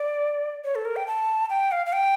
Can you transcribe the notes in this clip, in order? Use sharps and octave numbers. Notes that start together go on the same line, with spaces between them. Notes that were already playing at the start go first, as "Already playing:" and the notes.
Already playing: D5
C#5
A4
A#4
G5
A5
G5
F5
F5
G5